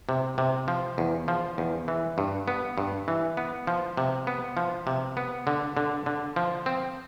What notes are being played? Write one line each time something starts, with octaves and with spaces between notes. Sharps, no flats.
C3
C3
F3
E2
F3
E2
E3
G2
B3
G2
E3
B3
F3
C3
B3
F3
C3
B3
D3
D3
D3
F3
C4